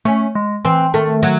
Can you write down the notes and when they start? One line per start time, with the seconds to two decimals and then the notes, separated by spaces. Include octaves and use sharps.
0.05 A3 C#4
0.35 G#3
0.65 E3 C4
0.94 D#3 A3
1.23 F#3